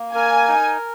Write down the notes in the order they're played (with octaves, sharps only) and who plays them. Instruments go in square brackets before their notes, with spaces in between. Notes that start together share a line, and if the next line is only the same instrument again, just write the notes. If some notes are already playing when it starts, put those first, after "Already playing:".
Already playing: [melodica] A#3
[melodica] A#4 [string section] G#5
[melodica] D#4